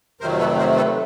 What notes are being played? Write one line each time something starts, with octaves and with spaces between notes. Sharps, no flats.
F2 C3 D#3 F#3 A3 A#4 C5
A4 B4
A#4 C5
A4 B4